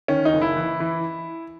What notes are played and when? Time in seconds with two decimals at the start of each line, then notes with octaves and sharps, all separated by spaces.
0.08 D#3 C#4
0.25 D#4
0.33 F#1
0.42 E4
0.57 E3
0.80 E3